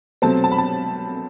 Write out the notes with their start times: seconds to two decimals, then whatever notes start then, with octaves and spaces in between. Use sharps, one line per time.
0.22 C2 B2 F#3 A3 C4 A5
0.44 A5
0.52 B5
0.58 A5